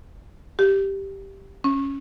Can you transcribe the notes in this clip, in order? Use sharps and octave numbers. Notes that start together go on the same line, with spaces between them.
G4
C#4